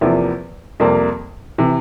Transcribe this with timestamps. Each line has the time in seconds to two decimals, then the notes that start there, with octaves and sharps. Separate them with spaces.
0.01 E2 C3 F3 A#3 E4
0.80 F2 C3 G3 A#3
1.58 C3 E3